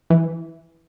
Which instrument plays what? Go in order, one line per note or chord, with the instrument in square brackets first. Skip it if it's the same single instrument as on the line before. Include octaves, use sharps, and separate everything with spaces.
[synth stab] E3